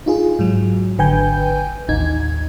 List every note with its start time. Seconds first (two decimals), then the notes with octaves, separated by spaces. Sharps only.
0.06 D#4 F4 G#4
0.39 G#2 F#3
0.98 G#1 D3 B4 G5 G#5 G6
1.88 A1 D#2 D#4 G#6